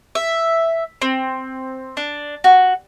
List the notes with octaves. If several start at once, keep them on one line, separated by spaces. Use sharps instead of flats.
E5
C4
D4
F#4